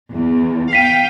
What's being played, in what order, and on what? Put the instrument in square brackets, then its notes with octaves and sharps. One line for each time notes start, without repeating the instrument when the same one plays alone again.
[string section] E2
[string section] F5 G5 [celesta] B6 D#7